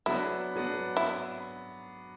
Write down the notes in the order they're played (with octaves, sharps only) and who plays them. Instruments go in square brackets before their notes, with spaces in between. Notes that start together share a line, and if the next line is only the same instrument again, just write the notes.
[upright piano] F#3 B3 D4 [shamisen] E4
[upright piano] F#3 B3 D4
[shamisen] E4